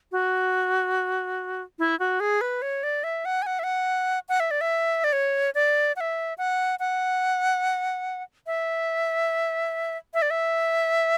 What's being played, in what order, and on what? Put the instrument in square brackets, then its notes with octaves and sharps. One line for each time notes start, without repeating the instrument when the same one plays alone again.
[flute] F#4
E4
F#4
G#4
B4
C#5
D5
E5
F#5
G#5
F#5
E5
F#5
F#5
E5
D5
E5
D5
C#5
D5
F#5
E5
F#5
F#5
E5
E5
D5
E5